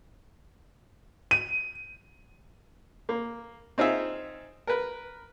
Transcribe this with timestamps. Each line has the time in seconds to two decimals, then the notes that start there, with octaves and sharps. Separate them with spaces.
1.31 D#7
3.09 A#3
3.78 C4 D#4 F4 G#4 E5
4.67 A#4 B4